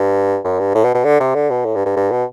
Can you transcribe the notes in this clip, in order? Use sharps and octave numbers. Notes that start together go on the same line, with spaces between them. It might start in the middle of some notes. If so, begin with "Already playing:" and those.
Already playing: G2
F#2
G2
A2
B2
B2
D3
C3
D3
B2
A2
G2
G2
G2
B2